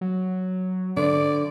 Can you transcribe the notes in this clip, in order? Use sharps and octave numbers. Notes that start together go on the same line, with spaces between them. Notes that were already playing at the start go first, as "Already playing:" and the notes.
F#3
D3 D5